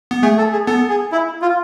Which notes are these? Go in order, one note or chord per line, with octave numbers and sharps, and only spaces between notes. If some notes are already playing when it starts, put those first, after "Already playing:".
B3
A3 G#4
A4
G#4
B3 A4
G#4
E4
F4